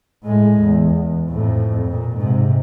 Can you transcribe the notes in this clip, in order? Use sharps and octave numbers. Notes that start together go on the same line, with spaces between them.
A2 G#3
E2
E2
F2 A2
A#2
G#2 C3